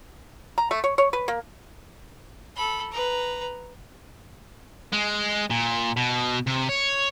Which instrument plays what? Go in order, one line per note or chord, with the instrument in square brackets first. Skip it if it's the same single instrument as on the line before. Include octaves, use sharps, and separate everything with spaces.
[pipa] A#5
A3
C#5
C#5
B4
A#3
[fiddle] A4 B5
B4 A#5
[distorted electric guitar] G#3
A#2
B2
C3
C#5